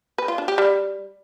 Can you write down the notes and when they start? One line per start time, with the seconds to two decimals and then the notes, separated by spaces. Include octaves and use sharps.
0.18 B4
0.28 F4
0.38 D4
0.48 G4
0.58 G3